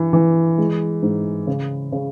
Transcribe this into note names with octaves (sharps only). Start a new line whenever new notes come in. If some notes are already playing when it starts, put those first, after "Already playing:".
Already playing: G2 E3
E3
G#3
G#2
C#3
C#3